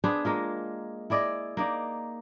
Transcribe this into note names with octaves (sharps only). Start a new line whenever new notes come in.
B3 D4 G#4 C5
G#3 A#3 F4
E4 G#4 D5 D#5
A#3 D#4 D5